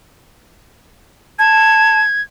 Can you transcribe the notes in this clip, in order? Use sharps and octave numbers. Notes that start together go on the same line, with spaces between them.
A5 G#6